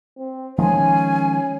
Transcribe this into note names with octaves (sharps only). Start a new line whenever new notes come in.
C4
D#3 F3 G#3 C#4 G#5